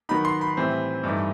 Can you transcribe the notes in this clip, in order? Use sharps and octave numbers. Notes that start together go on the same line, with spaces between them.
D#3 F#3 B3 D#4 B5
C6
B5
A2 E3 G3 C4
G2 E3 A3 D#4